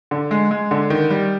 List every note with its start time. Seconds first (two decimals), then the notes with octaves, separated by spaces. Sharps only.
0.11 D3
0.31 G#3
0.51 G#3
0.71 D3
0.90 D#3
1.10 G3